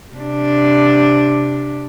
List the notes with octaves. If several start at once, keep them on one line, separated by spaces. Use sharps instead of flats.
C3 D4